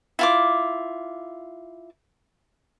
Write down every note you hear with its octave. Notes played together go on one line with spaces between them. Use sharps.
E4 F4 D6